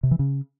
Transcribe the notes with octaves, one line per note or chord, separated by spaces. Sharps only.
C3
E3
C#3